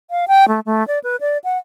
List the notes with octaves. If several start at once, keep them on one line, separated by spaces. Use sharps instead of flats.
F5
G5
A3
A3
D5
B4
D5
F#5